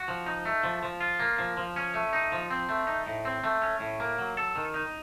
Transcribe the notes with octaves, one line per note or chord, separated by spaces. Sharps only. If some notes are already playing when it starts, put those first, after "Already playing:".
Already playing: F#4
F3
D#4
A3
F3
F3
F4
A#3
F3
F3
C#4
A3
D#4
F3
C4
A3
D#4
A2
C4
A3
C#4
A2
A#3
F#3
A4
D#3
D#4